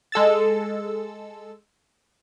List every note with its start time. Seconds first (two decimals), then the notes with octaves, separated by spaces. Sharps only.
0.12 G#3 A4 E6 A6